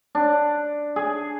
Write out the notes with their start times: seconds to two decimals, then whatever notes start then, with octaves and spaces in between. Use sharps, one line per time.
0.15 D4
0.96 G#4